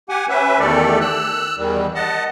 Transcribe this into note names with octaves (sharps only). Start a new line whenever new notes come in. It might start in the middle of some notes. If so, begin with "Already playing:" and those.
G4 F#5 G#5
C#4 B4 E5
E2 D#3 A3 G4 A4 D5
E6 F#6
E2 D#3 G3
D#5 F#5 A5